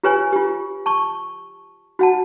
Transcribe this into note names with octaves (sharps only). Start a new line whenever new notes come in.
F4 G4 B4 C#5 G#5
F4 G4
A5 C#6
F#4 F#5 A5